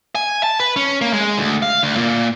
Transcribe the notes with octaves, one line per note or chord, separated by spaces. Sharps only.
G#5
A5
B4
C#4
A#3
G#3
D2
F5
D2
A#2